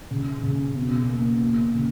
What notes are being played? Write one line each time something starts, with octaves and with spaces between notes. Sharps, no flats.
C#3
C#3
B2
A#3
A#3
C#3